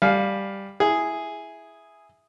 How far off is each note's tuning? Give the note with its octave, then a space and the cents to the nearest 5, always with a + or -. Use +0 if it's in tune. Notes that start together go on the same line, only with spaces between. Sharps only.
G3 +5 F5 +5 G#5 +25
E4 +0 G#4 +0